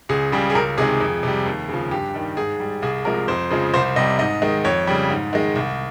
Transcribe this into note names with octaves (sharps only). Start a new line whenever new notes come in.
C#2 G#4
C#3 G3
G#4
C#2 A#4
C3 D#3 G#3 G#4
F2
C3 G3
D#2
C#3 F3
G2 G4
D#3 G3
G#2 G#4
G3
C2 G#4
C3 F3 G#3 A#4
F2 C5
C#3 F3 G#3
C2 C5
C3 G3 D#5
G#2 D#5
D#3 G#3
F2 C#5
C#3 G3
G#2
D#3 G#3
C2